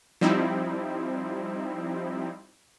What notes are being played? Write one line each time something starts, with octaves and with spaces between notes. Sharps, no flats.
F3 G3 C4 D#4 E4